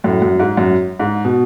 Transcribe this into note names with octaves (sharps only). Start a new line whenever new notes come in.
F#2 A2
F#2
G#2
F#2
G#2
B2